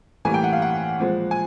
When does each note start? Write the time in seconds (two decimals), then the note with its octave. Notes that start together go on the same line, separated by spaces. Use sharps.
0.25 A2 E3 G3 A#3 G#5
0.34 G5
0.44 F#5
0.53 F5
0.62 F#5
0.99 A#2 F3 G#3
1.31 G#5